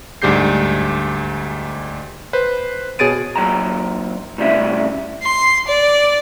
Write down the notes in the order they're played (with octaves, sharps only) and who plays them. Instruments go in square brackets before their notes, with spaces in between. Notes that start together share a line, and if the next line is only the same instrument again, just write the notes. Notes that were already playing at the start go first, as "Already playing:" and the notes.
[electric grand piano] D2 G#2 G3 G4 G6 C7
B4 C5
B2 G#4 C#5 A6 D7 D#7
[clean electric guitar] A#2 F#3 G5 A#5
A2 C3 G3 C#4 E5
[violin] C6
D5